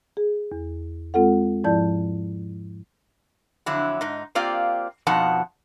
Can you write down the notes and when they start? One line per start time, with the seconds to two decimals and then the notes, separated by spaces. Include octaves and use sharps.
0.17 G#4
0.52 E2
1.14 G#3 C4 F4 A4 F#5
1.64 G#2 F3 E4 D5 A5 G6
3.66 F2 D3 F#3 E4
4.01 G#2 D#4
4.35 A#3 C4 F4 G4 D5 F5
5.07 F2 B2 F3 D#4 F#5 A5